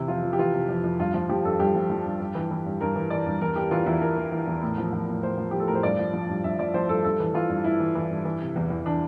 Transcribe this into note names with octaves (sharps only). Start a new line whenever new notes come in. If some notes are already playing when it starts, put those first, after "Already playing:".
Already playing: C3 E3 E4
F2 F4
F2
G4
E3 F4
C3
F2
F2
G2 F4
F3 F4
F3 G4
G2 A4
G2 G4
F3
F3
G2
G2
E3
E3
G2
G2 A#4
E3
E3 D5
G2
E2 A#4
E3 G4
E3 F4
E2 E4
E2 A#4
E3
E3
E2
A2
F3
F3
A2
A2 C5
F3
F3 G4
A4
A2 A#4
C5
G2 D5
F3
F3
G2
G2 E5
F3 D5
F3 C5
G2 A4
G2 A4
E3
E3 F4
G2
G2 E4
E3
E3
G2
E3
C3
E2
E2
E3 D4